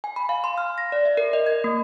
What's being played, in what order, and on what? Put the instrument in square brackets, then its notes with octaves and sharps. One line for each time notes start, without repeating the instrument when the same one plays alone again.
[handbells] G#5
B5
F5
C6
F6
A#6
D5
E5
A#4
D#5
G#6
A#3